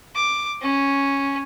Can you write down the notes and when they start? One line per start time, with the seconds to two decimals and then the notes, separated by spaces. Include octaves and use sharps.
0.15 D6
0.61 C#4